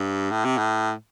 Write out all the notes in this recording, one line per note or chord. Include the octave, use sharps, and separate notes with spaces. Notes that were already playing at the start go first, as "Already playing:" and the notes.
Already playing: G2
A2
C3
A2